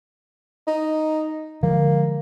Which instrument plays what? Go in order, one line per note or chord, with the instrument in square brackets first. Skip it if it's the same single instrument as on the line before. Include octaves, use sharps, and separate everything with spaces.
[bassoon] D#4
[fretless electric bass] D3 F3 G#3 [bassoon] A#3